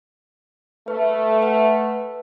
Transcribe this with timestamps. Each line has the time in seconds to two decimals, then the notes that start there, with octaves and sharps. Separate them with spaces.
0.88 A3 B4
1.43 B4 F#5